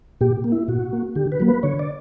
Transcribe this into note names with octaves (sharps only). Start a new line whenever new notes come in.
A#2 G4
A#3
E4
A#2 F#4
A#3
D3 G4
B4
F#3 A#3
B4
D3 C#5
D5